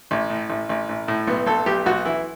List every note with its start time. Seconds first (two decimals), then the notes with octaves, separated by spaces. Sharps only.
0.11 A1
0.30 A2
0.49 A1
0.69 A1
0.89 A1
1.08 A2
1.27 B1 B3
1.47 B1 A4
1.66 B1 G4
1.86 B1 F#4
2.05 E3 E4